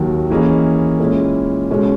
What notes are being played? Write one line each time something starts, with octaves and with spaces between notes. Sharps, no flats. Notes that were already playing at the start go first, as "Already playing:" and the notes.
Already playing: D#2 D#3 F#3
E3 A#3 C#4 G#4 D#5
A#2 G#3 C#4 E4
C#2 B2 G#3 C#4